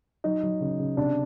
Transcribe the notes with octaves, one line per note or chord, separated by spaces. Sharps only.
F#3 D#4
F#3
C#3
C#3
C3 D4